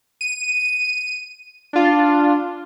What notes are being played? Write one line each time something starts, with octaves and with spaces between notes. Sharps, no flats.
D#7
D4 F4